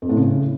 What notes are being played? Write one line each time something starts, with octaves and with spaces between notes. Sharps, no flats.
F2
A2
C#3